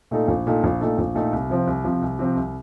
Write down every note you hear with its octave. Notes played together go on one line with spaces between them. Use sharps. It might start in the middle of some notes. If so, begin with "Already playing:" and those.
A#2 A3 D#4 A4
A#1
A#2 A3 D#4 A4
A#1
A#2 A3 D#4 A4
A#1
A#2 A3 D#4 A4
C2
C3 F3 C4
C2
C3 F3 C4
C2
C3 F3 C4
C2